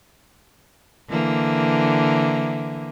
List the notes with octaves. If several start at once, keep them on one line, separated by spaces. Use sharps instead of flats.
D3 E3 A#3